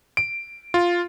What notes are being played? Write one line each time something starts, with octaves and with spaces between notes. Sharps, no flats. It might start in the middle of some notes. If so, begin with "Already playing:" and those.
D7
F4